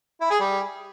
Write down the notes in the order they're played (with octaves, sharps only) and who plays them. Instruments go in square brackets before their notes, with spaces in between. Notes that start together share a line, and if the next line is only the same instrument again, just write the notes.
[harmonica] E4
G#4
G3